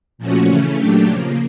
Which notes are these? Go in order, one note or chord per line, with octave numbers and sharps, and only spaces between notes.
A#2 F3 A3 C#4 F#4
C#3 E3 A3 C#4
A#2 F#3 A3 D4 G4
C#3 F3 A#3